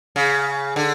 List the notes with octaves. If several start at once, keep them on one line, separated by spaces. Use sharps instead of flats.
C#3
D3